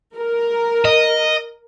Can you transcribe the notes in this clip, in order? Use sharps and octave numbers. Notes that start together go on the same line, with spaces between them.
A#4
D#5